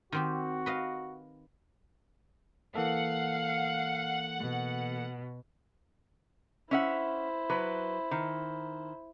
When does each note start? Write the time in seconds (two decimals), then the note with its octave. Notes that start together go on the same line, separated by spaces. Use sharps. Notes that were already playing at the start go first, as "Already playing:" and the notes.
0.12 D#3 C4 F#4 G4
0.66 B4 D#5 F5
2.75 E3 A#3 A4 F5 F#5
4.39 B2
6.71 C#4 E4 C5 E5 F#5
7.50 F#3 B4
8.11 D#3